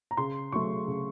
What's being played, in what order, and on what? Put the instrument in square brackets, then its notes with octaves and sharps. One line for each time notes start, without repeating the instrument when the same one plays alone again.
[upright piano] A#5
C#3 C6
F#3 A3 C#6
C#3